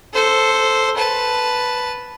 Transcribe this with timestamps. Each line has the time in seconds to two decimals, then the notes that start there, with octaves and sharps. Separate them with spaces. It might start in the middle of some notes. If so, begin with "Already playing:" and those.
0.14 A4 C5
0.97 B4 A5